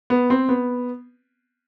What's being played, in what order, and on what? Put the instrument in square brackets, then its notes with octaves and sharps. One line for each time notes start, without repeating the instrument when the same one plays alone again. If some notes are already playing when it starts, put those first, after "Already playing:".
[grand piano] B3
C4
B3